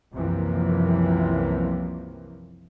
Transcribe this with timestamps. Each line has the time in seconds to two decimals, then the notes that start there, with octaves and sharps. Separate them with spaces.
0.13 C2 F#2 C3 E3 F3 A#3